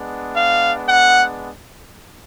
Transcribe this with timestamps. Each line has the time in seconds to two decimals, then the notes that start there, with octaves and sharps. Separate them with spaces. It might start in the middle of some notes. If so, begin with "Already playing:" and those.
Already playing: G#3 B3 D4
0.34 F5
0.87 F#5